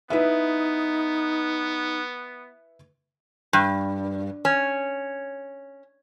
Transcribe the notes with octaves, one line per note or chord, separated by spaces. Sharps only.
B3 D#4 E4 B4 E5
G2
C#4